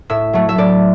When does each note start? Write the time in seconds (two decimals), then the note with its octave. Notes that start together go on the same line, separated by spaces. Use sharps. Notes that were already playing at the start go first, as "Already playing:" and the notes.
0.10 A2 E5
0.33 F#3 A3
0.49 E5
0.58 A2 D5